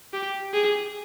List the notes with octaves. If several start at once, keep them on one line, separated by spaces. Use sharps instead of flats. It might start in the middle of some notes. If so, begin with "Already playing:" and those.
G4
G#4